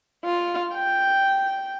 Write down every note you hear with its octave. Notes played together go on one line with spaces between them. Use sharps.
F4
G5